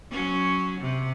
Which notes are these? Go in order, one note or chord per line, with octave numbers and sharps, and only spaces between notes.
F#3 C#4
C3